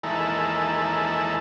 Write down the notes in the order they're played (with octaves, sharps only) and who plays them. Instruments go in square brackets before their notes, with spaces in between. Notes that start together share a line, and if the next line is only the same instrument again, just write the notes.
[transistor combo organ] E2 D#3 G#3 A#3 E4 A4